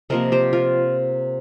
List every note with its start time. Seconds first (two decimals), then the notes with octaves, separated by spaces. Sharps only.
0.10 C3 F3 A#3 A#4 D#5
0.32 G4 C5
0.53 F4 A#4